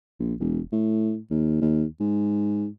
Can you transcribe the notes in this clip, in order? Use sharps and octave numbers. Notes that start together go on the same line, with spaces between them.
A#1
E1
A2
D#2
D#2
G#2